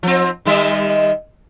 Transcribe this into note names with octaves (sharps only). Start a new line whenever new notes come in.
F3 C4
D#3 G3 E5